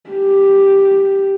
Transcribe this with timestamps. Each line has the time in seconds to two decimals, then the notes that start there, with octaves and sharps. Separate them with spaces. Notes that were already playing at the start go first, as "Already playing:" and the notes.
0.10 G4